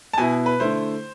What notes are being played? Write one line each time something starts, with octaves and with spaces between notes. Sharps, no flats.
A5
B2 B3 E4 G#5
B4
D3 A3 E4 C5